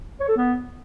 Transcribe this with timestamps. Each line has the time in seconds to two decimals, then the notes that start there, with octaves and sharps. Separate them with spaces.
0.20 C#5
0.28 A4
0.37 B3